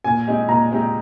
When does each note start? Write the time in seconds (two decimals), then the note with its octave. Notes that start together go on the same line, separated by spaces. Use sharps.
0.04 A#2 G#5
0.27 G#3 C4 D#4 G4
0.49 A#2 A#5
0.71 G#3 C4 D#4 G4